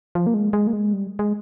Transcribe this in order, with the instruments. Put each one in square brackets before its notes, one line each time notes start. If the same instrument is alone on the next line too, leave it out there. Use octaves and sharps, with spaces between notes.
[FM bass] F3
A#3
G#3
G#3
A#3
G#3
G3
G#3